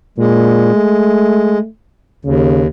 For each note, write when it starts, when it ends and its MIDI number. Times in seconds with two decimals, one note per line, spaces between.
0.18 0.70 46
0.18 1.59 56
0.75 1.67 57
2.25 2.67 39
2.25 2.63 49